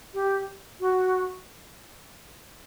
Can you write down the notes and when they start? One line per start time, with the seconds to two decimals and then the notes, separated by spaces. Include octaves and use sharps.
0.14 G4
0.80 F#4